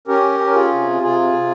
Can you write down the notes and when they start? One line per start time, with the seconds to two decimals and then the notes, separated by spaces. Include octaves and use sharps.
0.08 C#4 G4 A#4
0.40 C#4
0.51 A#4
0.55 F4 G#4
0.71 C3
1.02 C3 F4 G#4
1.34 C3